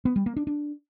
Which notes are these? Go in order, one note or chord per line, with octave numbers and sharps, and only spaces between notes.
B3
G3
A#3
D4
D4